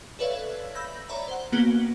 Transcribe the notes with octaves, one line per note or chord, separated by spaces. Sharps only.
A4 B4 C#5 D5 E5 F5
B5 E6 G6 A#6
C#5 D5 E5 A#5 B5
C5 F#5
A#3 B3 C#4 F#4 G4